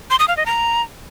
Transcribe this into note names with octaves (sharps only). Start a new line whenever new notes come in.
C6
D#6
F5
D#5
A#5